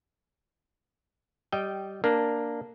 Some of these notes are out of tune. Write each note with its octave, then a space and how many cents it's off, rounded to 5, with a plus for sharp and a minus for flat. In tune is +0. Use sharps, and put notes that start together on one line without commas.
G3 -15 D#5 +0 G5 -5
A#3 +0 D4 +0